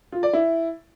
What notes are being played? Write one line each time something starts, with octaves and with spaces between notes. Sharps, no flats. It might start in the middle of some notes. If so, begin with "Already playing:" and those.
F4
D5
E4